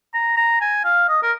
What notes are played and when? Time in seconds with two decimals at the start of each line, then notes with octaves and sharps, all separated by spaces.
0.14 A#5
0.37 A#5
0.61 G#5
0.84 F5
1.09 D#5
1.23 A#4